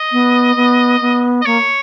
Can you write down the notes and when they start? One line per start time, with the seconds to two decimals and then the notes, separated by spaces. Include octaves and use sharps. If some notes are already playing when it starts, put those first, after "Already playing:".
Already playing: D#5
0.12 B3
0.56 B3
1.01 B3
1.41 D#5
1.45 A#3 C#5